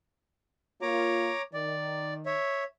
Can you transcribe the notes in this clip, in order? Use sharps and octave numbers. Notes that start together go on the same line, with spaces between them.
A#3 F4 C#5 A#5 D6
D#3 D5
C#5 E5